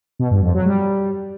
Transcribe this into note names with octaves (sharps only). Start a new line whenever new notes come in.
B2
G2
F2
F#3
G3